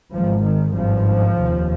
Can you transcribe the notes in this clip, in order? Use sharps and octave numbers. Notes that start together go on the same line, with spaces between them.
G#1 G#2 F3
D#3
G#1 G2 F3
F1 D#2